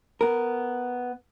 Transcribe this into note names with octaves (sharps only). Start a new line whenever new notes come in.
B3 A#4